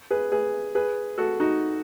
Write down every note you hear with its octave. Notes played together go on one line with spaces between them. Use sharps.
G#4 B4
G#4 B4
G#4 B4
F#4 A4
D#4 F#4